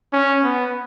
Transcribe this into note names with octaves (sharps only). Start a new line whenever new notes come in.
C#4
B3